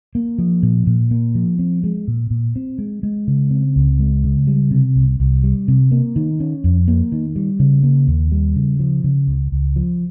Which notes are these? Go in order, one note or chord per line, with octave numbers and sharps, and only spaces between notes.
A#3
F3
A#2
A#2
A#3
F3
C4
G#3
A#2
A#2
C4
G#3
G#3
C#3
C4
C#2
G#3
C#3
G3
C3
C2
C2
G3
C3
A#3
D#3
C#4
F2
A#3
D#3
G3
C#3
A#3
D#2
G3
C#3
F3
C#3
C#2
C#2
F3